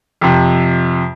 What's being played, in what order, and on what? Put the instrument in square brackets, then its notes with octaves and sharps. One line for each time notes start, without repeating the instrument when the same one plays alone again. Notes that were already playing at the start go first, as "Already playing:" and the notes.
[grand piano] F2 C3